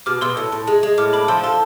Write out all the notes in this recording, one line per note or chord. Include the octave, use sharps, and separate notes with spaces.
B2 D6 F6
B2 C6 E6
A2
A2
G#3
G#3
A2 D6 F6
D4 B5 D6
F3 C6 E6
A4 A5 C6